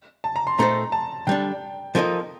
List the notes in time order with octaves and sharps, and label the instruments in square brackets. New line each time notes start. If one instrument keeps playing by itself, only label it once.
[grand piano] A5
A#5
C6
[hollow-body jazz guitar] A#2 A3 D#4 A4 C5 [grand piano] A#5
[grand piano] A5
[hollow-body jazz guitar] D3 G3 D4 [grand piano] G5
[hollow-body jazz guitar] F3 A#3 D#4 A4 D#5